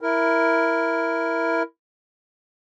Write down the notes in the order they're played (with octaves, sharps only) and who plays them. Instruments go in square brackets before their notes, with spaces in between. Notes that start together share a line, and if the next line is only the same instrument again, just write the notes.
[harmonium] E4 A#4